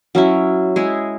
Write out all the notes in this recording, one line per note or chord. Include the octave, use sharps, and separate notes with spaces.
F#3 C#4 E4
G#3 E4 G#4